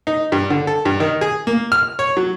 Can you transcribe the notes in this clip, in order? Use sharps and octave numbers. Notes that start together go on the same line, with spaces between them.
D#4
G2
D3
A4
G2
D#3
G#4
A#3
F6
C#5
F#3